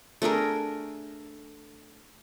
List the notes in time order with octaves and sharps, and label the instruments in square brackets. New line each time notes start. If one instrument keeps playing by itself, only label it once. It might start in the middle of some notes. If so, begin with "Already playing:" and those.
[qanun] A3 D4 G#4 A#4